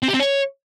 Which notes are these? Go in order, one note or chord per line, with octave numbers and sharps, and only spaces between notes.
C4
G4
C4
C#5